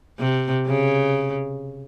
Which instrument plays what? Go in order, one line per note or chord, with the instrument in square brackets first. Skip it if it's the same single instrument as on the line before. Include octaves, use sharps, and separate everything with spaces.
[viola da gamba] C3
C#3